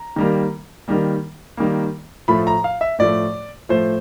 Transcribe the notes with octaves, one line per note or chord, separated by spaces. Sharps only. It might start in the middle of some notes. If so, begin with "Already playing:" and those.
Already playing: A#5
D#3 G3 A#3
D#3 G3 A#3
D#3 G3 A#3
A2 F3 A3 B5
A#5
F5
E5
A2 F3 A3 D5
A2 F3 A3 C5